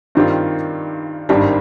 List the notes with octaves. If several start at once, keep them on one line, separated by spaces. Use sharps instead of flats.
G2 D#3 G3 C4 F4
G#1 G2 D#3 G3 D4